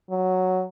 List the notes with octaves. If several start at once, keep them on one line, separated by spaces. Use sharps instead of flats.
F#3